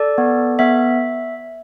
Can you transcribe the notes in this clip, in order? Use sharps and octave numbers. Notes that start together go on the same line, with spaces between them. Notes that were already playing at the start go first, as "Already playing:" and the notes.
Already playing: A4 D5
B3
B3 E5